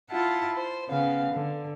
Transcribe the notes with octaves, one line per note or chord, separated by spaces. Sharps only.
E4 F4 F#5 A5
C5
C#3 B3 F5
D3